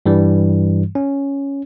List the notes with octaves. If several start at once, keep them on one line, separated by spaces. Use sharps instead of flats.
G2 E3 G3
C#4